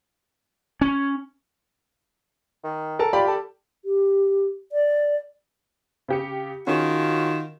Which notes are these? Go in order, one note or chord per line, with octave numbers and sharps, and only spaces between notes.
C#4
D#3
A4 A#4 A5
F4 G4 D5 B5
A4
G4
D5
C#3 G4 C#7
D#3 C#4 F4 F#4 G#4